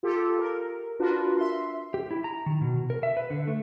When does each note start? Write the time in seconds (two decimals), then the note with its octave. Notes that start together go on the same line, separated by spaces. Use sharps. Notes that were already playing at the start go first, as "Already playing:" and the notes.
0.03 F4 G4 A4
0.39 A#4
0.99 D4 F4 F#4 A#4 B4
1.37 E5 C6
1.94 G4
2.11 E4
2.24 A#5
2.46 D#3
2.61 B2
2.90 A#4
3.03 E5
3.17 B4
3.30 D3
3.48 A3